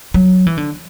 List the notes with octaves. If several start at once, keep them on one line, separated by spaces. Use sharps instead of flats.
F#3
E3
D3